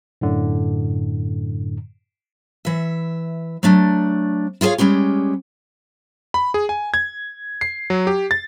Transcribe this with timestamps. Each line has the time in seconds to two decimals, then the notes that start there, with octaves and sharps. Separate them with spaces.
0.21 F#2 A2 D3
2.65 E3 E5
3.63 F#3 A3 D4
4.61 E4 F4 G#4 C#5 F5
4.78 G3 G#3 C#4 G4
6.34 B5
6.54 G#4
6.69 G#5
6.94 G#6
7.61 C7
7.90 F#3
8.07 G4
8.31 A6